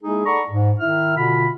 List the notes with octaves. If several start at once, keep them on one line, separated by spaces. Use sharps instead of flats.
G#3 A#3 D#4 E4 G#4
A4 D5 F#5 A#5 B5 C#6
G#2
D#3 E4 E5 F6
B2 D3 F4 B5